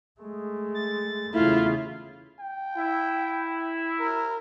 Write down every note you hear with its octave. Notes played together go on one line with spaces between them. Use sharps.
G#3 A3
A6
E2 C#3 A3 E4 F4
G5
E4
A#4